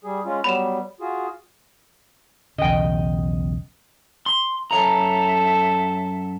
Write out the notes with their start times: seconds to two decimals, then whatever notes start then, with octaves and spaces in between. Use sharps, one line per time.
0.04 G3 G#4
0.25 G#3 C#4 F4
0.44 F#3 G3 B3 B5 E7
1.01 F4 F#4 G#4
2.58 B1 E2 C#3 D#5 G5
4.26 C6
4.71 F#2 A4 C#5 E5 A#5